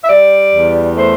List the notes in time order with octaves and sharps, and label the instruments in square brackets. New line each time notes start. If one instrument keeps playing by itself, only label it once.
[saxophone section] E5
G3 D5
E2
A3 C5